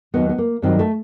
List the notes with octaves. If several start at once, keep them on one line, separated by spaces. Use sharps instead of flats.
D#2 D#3 F#3 B3
B3
A#3
G2 D#3 F#3 C4
A3